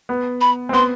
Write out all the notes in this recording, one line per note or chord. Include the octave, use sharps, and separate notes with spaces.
B3
B5
C4
B3 C6